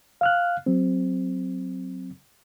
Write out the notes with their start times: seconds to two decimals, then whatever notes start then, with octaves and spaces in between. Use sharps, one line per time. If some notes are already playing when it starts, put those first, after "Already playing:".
0.21 F5 F6 F#6
0.66 F#3 C4